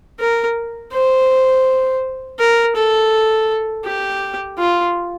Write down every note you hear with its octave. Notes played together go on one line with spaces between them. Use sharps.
A#4
C5
A#4
A4
G4
F4